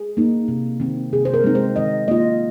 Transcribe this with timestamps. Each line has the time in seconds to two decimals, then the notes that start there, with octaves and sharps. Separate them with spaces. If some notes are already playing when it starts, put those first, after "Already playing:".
Already playing: G#4
0.17 A#3 D#4
0.48 C3
0.80 D#3 C4
1.13 C3 G#4
1.25 C5
1.34 A#4
1.44 G#3 C4 D#4
1.55 C5
1.76 D#3 D#5
2.08 A#3 F4 D#5